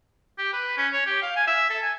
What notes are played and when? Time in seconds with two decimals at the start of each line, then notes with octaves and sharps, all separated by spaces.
0.38 G4
0.53 B4
0.77 C#4
0.93 C#5
1.06 G4
1.22 F5
1.36 G#5
1.47 E5
1.70 A4
1.82 G#5